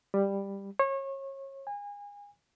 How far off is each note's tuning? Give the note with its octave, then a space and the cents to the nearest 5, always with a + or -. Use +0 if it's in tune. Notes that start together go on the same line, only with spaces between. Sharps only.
G3 +10
C#5 -30
G#5 -30